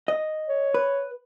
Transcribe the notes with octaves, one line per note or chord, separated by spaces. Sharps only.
D#5
C#5
B4